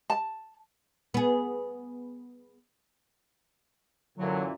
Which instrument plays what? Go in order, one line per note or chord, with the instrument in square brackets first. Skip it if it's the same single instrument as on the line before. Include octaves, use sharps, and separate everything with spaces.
[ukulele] A5
[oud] B3 G#4
[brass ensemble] F#2 A#2 E3 [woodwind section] D3 F#3